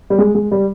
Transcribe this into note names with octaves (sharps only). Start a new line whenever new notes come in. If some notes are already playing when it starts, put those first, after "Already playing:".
G3
G#3
G#3
G3